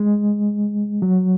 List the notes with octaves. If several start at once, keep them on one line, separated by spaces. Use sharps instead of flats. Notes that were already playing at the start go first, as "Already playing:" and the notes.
Already playing: G#3
F#3